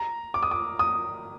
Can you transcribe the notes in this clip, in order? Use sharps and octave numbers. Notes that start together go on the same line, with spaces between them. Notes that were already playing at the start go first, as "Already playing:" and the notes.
Already playing: A#5
D6
D#6
D6
D#6